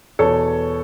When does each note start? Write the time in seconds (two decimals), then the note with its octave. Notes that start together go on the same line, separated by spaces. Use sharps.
0.19 E2 B2 A4 C#5